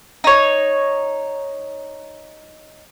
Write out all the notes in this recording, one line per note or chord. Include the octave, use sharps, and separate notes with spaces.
D#4 C#5